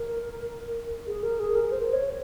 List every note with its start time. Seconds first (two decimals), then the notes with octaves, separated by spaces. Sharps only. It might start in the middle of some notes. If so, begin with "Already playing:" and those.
Already playing: A#4
1.07 G#4
1.23 A#4
1.39 G#4
1.55 A#4
1.72 C5
1.93 C#5